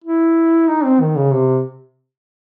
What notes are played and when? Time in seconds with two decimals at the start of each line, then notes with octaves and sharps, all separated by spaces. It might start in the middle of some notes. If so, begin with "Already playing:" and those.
0.04 E4
0.68 D#4
0.84 C4
1.01 D#3
1.17 C#3
1.33 C3